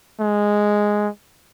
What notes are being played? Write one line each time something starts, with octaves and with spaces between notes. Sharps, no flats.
G#3